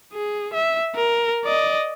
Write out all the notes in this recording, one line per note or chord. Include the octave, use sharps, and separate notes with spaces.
G#4
E5
A#4
D5 D#5